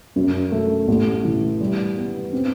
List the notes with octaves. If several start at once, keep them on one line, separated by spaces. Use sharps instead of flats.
F#2
A3
A1
E3
G3
B3
C4